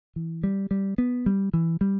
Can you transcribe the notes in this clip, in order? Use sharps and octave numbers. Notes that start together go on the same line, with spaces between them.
E3
G3
G3
B3
G3
E3
G3